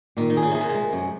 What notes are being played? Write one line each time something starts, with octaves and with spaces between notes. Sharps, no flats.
A#2 D#3
D#3
G#4
C#3
C3 G#4
A#2
C3 G#3
F#2